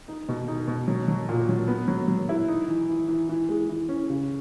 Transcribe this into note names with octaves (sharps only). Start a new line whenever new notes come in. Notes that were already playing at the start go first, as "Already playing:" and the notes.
D#4
B2
D#4
B2
F#3
F#3
A#2
F#3
B3
F#3
F#3
E4
D#4
E3
E3
E3
E3
G#3
E3
C#4
C#3